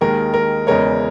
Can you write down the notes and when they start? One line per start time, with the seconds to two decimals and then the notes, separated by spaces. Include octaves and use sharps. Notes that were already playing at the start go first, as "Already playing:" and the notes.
0.01 D#2 D#3 G#3 A#4
0.34 A#4
0.67 E2 C#3 E3 G#3 A#4 C#5